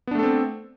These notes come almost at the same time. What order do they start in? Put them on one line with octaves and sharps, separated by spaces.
B3 D4 A3 A4 C4